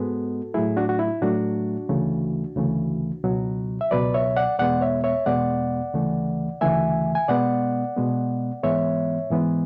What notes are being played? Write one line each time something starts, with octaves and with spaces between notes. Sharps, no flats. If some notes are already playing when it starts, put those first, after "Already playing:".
Already playing: G#2 G#3 B3 F#4 A4
A2 F#3 A3 E4 G#4
D4 F#4
F#4
E4
A2 F#3 A3 D4 F#4
D2 C#3 E3 A3
D2 C#3 E3 A3
C#2 B2 F#3
E5
C#2 B2 F#3 B4 D5
C#5 E5
D5 F#5
E2 B2 G#3 B3 D5 F#5
C#5 E5
C#5 E5
E2 B2 G#3 B3 D5 F#5
D2 C#3 E3 A3
D2 C#3 E3 A3 E5 G#5
G#5
B2 G#3 B3 D5 F#5
B2 G#3 B3
G#2 E3 G#3 B3 C#5 E5
G#2 E3 G#3 B3